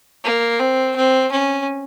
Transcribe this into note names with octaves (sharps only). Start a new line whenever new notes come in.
A#3
C4
C4
C#4